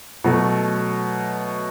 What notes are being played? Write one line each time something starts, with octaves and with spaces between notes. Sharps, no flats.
B2 F#3 A3